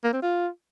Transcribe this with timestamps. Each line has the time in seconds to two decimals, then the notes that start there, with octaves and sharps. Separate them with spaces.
0.04 A#3
0.13 C4
0.22 F4